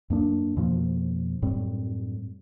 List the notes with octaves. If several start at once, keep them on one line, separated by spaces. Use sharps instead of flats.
F#2 A#3 D4
F2 B2 F3 A#3
F#2 A2 G3 C4